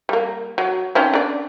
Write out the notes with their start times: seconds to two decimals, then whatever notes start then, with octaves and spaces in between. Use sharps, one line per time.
0.09 G3 A#3
0.58 F#3
0.95 C4 C#4 D#4
1.14 D4 D5